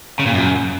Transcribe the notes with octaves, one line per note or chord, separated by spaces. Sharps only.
C#3
A#2
F#2